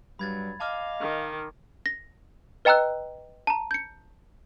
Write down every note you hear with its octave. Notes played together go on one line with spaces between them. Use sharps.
G2 F#3 G3 B5 G#6 A6
D#5 F5 A5 D6 F6
D#3
A#6
B4 D#5 G5 A#5 E6 F#6
A5 A#5
G6 C#7